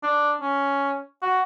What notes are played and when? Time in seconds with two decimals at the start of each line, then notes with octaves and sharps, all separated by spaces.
0.03 D4
0.41 C#4
1.22 F#4